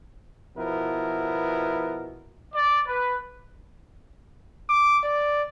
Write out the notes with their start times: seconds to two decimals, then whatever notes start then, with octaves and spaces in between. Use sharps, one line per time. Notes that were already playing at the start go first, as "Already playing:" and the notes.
0.57 B2 F3 B3 E4 A#4
2.53 D5
2.86 B4
4.69 D6
5.04 D5